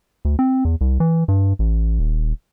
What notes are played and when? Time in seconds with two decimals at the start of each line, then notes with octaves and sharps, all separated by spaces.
0.25 D2
0.39 C4
0.65 E2
0.81 C2
1.00 E3
1.28 G2
1.59 A1
1.99 D#1